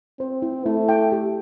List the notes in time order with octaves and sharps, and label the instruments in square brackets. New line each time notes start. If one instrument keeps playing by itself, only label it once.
[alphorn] C4 [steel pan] C5
[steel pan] E4
[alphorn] A3 [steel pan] E4
[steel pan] G5
G4